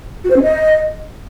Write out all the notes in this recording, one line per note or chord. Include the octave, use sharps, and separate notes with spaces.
F#4
C5
C#4
D#5